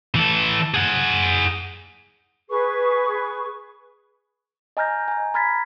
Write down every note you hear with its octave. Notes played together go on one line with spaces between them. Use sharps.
E3 A4
G#4 F#5
G#4 B4 C#6
D#5 G#5 A#5 F6 G6 A#6
G#5 A#5
A#5 B5 F6 G#6 A6 B6